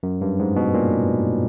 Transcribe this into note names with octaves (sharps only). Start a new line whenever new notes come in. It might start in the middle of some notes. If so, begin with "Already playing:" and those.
F#2
G2
G#2
B2
A#2